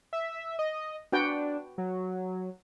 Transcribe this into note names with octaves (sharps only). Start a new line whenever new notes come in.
E5
D#5
D4 F#4 B4 G5
F#3